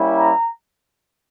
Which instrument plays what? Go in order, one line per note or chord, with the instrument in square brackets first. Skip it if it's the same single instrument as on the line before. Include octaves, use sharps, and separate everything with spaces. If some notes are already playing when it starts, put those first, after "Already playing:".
Already playing: [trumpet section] G3 A#3 C#4 E4
A#5